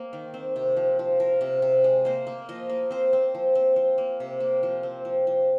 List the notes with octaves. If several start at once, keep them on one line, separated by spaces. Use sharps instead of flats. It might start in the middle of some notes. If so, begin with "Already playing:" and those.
Already playing: A#3 C4
D#3
C4
C3
F3
F3
F3 A#4
C3
C3
G#3
A#3 C5
A#3
F3 D#5
A#3
C4 C5
C4
F3
C4
F3
A#3
C3
A#3
F3
C4
F3
F3